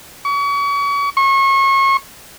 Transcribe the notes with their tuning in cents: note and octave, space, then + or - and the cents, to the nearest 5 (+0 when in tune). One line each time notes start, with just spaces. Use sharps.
C#6 +35
C#6 -35